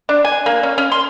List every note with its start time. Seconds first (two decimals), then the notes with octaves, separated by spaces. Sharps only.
0.09 D4
0.25 G#5
0.46 A#3
0.63 C#4
0.78 C#4
0.92 C6